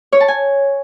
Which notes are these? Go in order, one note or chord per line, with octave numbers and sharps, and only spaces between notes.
C#5
A5
G#5